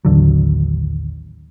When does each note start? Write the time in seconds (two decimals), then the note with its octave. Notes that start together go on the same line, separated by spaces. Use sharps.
0.05 A1 D#2 D3 F#3